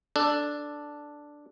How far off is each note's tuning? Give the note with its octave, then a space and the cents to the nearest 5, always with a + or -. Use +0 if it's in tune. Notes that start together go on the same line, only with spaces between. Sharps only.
D4 +0 A4 +0